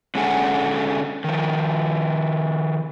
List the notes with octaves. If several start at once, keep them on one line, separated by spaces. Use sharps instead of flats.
D3 G#3 C#4 G#4 A4 F#5
D#3 F3